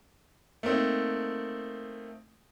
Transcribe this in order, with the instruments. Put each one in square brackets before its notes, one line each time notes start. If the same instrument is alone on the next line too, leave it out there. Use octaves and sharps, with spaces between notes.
[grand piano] A3 A#3 C4 D#4